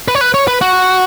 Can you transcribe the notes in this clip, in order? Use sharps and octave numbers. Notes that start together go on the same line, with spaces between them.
B4
C#5
B4
C#5
B4
F#4